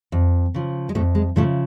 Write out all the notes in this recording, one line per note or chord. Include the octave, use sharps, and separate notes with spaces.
F2
C#3 F3
G#3
F2 A2 A3
G#3
A2 C#3 F3 A3